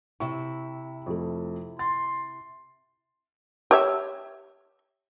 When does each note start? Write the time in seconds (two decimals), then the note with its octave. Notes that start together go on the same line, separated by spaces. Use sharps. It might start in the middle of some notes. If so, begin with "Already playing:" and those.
0.20 C3 E4 C#6
1.06 F2 A3
1.79 C6 A6
3.71 G4 C#5 E5